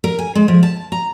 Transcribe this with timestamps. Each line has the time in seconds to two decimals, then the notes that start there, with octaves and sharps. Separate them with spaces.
0.04 A#4
0.19 G#5
0.35 G#3
0.48 F3
0.63 A5
0.92 A#5